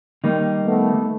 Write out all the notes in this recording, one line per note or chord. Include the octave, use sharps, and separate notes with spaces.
D#3 G3 A#3 D#4
A3 B3